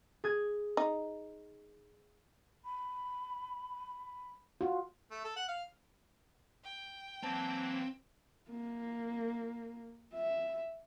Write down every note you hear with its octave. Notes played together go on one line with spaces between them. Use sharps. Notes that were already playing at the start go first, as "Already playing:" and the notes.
G#4 G#6
D#4
B5
F4 F#4
A3
A4
F#5
F5
G5
E3 F#3 A#3 C4 A5
A#3
E5